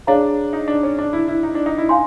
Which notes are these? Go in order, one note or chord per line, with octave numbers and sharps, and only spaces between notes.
D4 G#4 C#5 F5 A#5
D#4
D4
C#4
D4
E4
E4
D#4
D4
D#4
E4
D#4 F5 G#5 C6